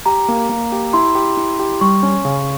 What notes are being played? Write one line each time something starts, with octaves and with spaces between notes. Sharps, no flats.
G4 A#5
A#3
A#3
G4
E4 C6
G4
E4
G4
G3 C#6
C#4
C#3